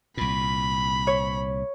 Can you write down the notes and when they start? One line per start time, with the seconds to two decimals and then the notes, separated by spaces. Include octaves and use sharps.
0.17 C2 A#2 B5
1.07 C#5